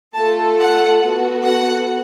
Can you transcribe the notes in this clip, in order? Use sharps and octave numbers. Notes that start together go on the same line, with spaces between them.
A3 F4 A4 A5
F#5
B3 F#4 A4
F#5